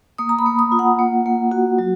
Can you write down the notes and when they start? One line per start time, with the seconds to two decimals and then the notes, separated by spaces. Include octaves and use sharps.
0.18 A#3 D#6
0.29 A#5
0.39 B5
0.46 A#3
0.59 D#6
0.72 F4
0.79 F#5
0.99 A#3
1.26 A#3
1.52 F#4
1.79 F#3